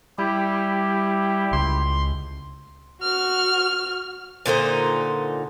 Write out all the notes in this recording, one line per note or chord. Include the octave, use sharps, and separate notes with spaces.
G3 E4 G4
C#2 C6
F#4 F6
A#2 D3 D#4 C5